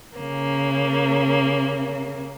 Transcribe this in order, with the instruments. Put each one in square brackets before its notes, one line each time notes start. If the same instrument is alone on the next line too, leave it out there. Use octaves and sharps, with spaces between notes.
[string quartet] C#3 A#3